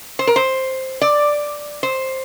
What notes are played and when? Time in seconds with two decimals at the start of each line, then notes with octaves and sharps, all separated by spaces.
0.19 C5
0.27 A#4
0.36 C5
1.01 D5
1.83 C5